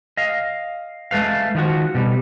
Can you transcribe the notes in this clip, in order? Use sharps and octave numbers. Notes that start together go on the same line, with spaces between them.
D#5 F5
G#3 A3 B4 F5
D#3 F3 F#4
B2 G3